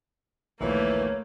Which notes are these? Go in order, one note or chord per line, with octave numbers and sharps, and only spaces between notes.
A#1 D#2 A#2 E3 A3 A#3 C#5